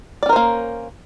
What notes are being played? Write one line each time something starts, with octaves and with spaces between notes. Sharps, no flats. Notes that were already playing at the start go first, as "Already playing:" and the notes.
A#3 C#4 A#4 C5 D5